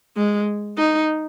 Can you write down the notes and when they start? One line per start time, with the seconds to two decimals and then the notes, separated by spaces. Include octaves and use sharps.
0.17 G#3
0.78 D#4